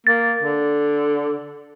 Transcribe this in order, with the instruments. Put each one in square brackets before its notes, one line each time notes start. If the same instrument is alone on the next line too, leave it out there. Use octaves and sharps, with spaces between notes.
[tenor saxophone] A#3 [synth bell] A6
[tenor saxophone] D3